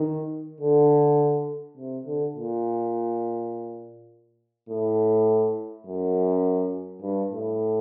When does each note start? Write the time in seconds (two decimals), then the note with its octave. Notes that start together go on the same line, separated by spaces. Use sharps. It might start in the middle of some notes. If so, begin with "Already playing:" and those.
Already playing: D#3
0.60 D3
1.77 C3
2.06 D3
2.36 A#2
4.69 A2
5.86 F#2
7.02 G2
7.32 A2